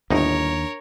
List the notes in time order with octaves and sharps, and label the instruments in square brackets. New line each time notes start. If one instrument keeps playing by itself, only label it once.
[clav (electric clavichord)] G1 A2 D#4 [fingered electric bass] D#2 [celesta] D4 [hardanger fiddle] A#4 C#5